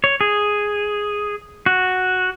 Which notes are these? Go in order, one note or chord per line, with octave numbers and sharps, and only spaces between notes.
C#5
G#4
F#4